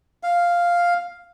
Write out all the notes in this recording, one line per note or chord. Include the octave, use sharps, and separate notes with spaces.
F5